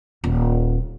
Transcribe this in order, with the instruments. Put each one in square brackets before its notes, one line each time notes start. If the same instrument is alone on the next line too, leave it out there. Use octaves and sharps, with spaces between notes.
[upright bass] D#1